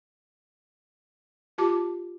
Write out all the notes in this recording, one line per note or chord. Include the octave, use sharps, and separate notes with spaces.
F4 G4 A5 D6